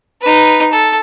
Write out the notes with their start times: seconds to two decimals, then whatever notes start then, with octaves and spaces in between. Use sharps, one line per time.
0.21 D#4 B4
0.71 A4